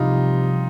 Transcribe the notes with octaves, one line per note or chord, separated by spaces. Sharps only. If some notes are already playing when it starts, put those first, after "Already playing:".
Already playing: C2 C3 F3 D#4 F4